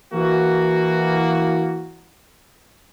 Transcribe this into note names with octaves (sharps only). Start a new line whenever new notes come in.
E3 A#3 F#4